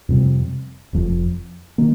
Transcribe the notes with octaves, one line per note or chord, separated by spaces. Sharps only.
F2 C3 G3 C4
F1 F2 F3
D#3 A#3